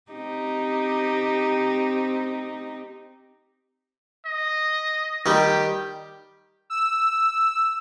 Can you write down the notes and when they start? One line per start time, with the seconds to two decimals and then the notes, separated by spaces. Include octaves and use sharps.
0.12 C4 D#4 G4
4.26 D#5
5.26 D#3 G3 G4
6.70 E6